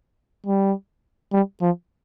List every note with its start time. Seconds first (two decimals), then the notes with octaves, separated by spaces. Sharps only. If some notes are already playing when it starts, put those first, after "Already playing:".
0.47 G3
1.32 G3
1.62 F3